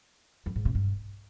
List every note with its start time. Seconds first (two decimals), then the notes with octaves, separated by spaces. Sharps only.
0.46 F2
0.56 G#2
0.65 C3
0.75 G2